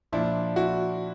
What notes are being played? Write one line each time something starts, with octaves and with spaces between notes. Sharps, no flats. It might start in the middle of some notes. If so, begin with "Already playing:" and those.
A#2 F3 D4 E4
E4 F#4